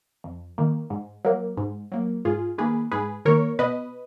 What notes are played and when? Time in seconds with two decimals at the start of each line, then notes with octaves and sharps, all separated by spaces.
0.24 F2
0.58 D#3 A#3
0.90 G#2
1.25 F#3 A#3
1.57 G#2
1.92 F#3 A#3
2.25 G#2 F4 G#4
2.58 D#3 A#3 G#4 B4
2.92 G#2 G#4 B4
3.25 D#3 A#3 A#4 C#5
3.59 B2 B4 D#5